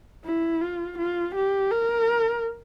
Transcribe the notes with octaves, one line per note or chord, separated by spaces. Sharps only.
E4
F4
F4
G4
A#4